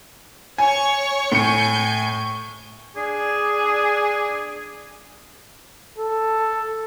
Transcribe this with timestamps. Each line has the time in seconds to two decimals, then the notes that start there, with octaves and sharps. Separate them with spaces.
0.58 C#5 G#5 C#6
1.32 A2 G#5 G6 C#7
2.96 D4 G#4
5.98 A4